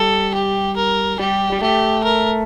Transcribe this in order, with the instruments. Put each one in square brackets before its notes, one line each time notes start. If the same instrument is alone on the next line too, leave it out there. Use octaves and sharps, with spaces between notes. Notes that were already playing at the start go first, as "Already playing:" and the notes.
Already playing: [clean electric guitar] G3 [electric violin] A4
[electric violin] G4
A#4
[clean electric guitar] G3 [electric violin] G4
[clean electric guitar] G3
[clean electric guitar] A3 [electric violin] G4
[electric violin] A#4